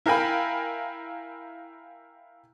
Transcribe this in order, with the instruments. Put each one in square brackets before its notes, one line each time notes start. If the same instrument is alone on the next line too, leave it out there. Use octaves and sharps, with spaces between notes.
[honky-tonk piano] E4 A#4 F5 G5 G#5 B5